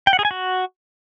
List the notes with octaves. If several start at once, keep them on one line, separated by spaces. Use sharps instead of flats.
G5
F#5
G#4
G#5
F#4